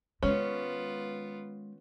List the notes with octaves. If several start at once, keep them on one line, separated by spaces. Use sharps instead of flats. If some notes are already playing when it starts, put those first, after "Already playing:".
D#3 G#3 B3 C#4 F4